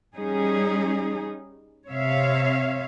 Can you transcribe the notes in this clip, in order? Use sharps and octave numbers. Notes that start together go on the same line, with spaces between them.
G3 C#4 D#4 G#4
C3 C#5 E5 F5